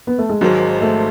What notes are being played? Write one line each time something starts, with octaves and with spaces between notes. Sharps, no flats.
B3
A3
G#3
G#1 G#2 D#3 F#3 G#3
A3